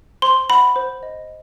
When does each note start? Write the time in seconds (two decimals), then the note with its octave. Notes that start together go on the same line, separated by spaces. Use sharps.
0.22 C5 C6
0.50 F#5 B5
0.76 C5
1.03 D#5